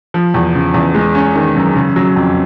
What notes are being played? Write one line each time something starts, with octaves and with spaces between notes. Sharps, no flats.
F3
E2
C#3
E2
G#3
C#4
D#3
F#2
C#3
F#3
F2